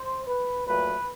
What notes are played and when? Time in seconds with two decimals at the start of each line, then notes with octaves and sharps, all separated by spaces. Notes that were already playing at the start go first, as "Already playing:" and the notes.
Already playing: C5
0.26 B4
0.67 A#2 F#3 A3 B4